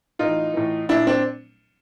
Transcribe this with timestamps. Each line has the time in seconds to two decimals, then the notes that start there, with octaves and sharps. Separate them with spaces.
0.19 A2 E3 D#4 F4
0.54 A2 E3
0.89 A#2 D4 E4
1.07 C4 D4